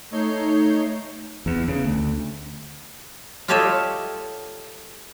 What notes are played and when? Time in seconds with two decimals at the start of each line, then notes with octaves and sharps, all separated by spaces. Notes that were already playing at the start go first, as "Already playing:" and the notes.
0.11 A3 D#4 C#5 G6 C7
1.46 E2
1.68 C#3
1.84 D2
3.48 F4 G4 A4 C#5 D#5 E5